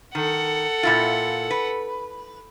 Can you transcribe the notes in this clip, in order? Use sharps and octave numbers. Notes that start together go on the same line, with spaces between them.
D#3 A4 F#5
A#2 E4 F4
B4